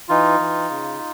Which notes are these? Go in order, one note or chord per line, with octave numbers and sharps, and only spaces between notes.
E3 D#4 F4
E3
C#3